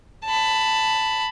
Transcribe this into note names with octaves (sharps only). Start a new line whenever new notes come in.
A5 B5